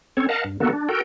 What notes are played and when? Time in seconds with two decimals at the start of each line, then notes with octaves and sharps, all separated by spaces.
0.17 C4 C#4 A4 C#5
0.29 A#4 D#5 F5 F#5 A5
0.44 G2
0.60 D3 D#3 A#3 B3 F#4 A4
0.73 D4
0.89 F#4 A4 A#4 G5